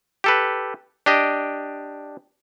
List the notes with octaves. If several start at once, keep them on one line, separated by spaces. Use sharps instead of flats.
G4 A4 B4
D4 G4 D#5